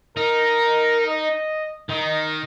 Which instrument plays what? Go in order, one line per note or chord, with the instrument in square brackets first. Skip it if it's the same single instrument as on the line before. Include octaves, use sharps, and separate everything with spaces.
[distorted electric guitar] D#4 [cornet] A#4
[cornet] D#5
[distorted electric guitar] D#3 [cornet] D#4